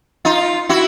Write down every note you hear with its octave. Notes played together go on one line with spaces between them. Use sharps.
D#4 F4
E4 F#4